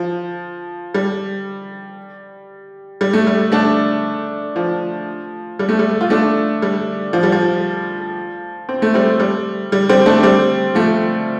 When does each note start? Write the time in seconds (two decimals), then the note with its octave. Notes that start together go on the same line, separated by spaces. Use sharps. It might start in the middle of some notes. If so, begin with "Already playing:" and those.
Already playing: F3
0.94 G3
3.01 G3
3.13 A3
3.27 G3
3.52 A3 D4
4.56 F3
5.59 G3
5.69 A3
5.79 G3
6.01 F4
6.10 A3 D4
6.62 G3
7.13 F3
7.23 G3
7.32 F3
8.69 C4
8.82 A3
8.94 G3 C4
9.20 G3
9.72 G3
9.89 G3 C4
10.06 A3 D4
10.23 G3 C4
10.75 F3 A3